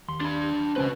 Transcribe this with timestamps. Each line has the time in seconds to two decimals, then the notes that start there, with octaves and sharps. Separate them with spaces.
0.08 D#2 C6
0.21 D4 B5
0.76 C#2 C#4 F#4 B4 C5